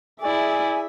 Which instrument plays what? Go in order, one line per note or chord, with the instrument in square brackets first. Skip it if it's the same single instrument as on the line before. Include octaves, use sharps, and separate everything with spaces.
[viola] E4 D5 [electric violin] G#4 E5 [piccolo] G#5